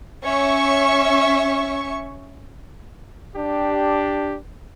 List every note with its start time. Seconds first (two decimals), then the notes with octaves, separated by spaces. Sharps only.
0.24 C#4 E5 C#6
3.36 D4 G4